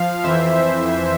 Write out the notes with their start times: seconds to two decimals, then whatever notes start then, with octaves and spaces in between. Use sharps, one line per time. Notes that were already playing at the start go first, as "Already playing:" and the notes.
Already playing: F3 F5
0.23 F2 E3 C5 E5